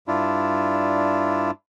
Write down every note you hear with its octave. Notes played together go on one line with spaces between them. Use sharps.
G2 D4 E4 F4